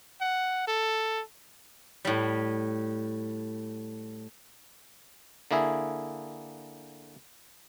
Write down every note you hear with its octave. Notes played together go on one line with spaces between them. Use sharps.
F#5
A4
A2 G3
D3 A#3 E4 G#4 E5